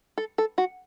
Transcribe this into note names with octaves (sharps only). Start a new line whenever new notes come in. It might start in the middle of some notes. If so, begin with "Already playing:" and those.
A4
A4
F#4